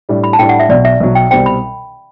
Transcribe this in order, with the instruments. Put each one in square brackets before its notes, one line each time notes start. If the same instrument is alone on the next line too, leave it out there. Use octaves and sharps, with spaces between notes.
[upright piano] A2 G3 D4
[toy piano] B5
A5
[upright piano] A2 G3 D4 [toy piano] G5
[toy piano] F#5
E5
[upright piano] B1 B2 F#3 [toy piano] D5
[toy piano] E5
[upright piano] B1 B2 F#3
[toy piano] G5
[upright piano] C2 B2 G3 C4 [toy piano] G5
[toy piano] B5